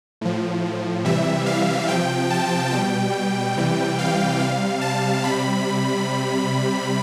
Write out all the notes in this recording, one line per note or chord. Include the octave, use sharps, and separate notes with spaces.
A2 F3
C3 E3 G3 E5
F5
C3 F3 G5
A5
B2 G3 G5
C3 E3 G3
F5
C3 G3 F5
A5
C3 G3 B5